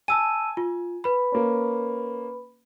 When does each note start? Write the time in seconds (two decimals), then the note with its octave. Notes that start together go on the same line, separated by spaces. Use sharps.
0.08 G#5 A5 E6 D#7
0.57 F4
1.04 B4 B5
1.32 A#3 C#4